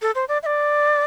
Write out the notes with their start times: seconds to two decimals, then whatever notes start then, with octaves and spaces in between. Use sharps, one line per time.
0.02 A4
0.15 C5
0.29 D5
0.43 E5
0.46 D5